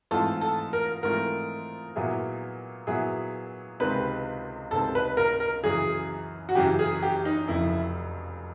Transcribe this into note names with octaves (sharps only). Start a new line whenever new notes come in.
G#2 E3 A3 C4 F4 A4
A4
A#4
G#2 E3 A3 C4 F4 A#4
A#2 F#3 B3 E4 G#4
A#2 F#3 B3 E4 G#4
C#2 C3 D#3 G#3 C4 B4
C#2 C3 D#3 G#3 C4 A4
B4
A#4
A#4
F#2 C#3 E3 G#4
F#4
F#2 C#3 E3 G4
G#4
G4
D#4
F1 F2 C#3 E4